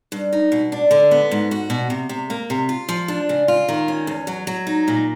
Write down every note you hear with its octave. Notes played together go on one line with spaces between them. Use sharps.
G2
D#4
B2
D4
D3
B3
G#2
F#4
B2
C3
C3
A#3
C3
F4
F3
D4
C#3
F4
D#3
C#4
E2
F#3
F#3
D#4
A#2